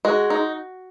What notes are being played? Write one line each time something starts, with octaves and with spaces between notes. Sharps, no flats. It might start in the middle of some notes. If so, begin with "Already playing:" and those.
G#3 F#4
D#4